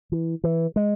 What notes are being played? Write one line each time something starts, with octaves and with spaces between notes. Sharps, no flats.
E3
E3
G#3